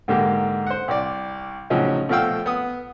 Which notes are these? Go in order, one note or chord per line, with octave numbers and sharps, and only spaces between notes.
G#2 D3 A#3 G4
C5 F#5
C2 D5
A2 C#3 F3 F#3 C#4 D#4
B2 F3 A3 F5 G5 E6
B3 D#6